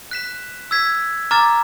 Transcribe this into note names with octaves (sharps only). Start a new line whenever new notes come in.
F#6 B6 E7
E6 G#6 B6
A#5 D6 F6 A6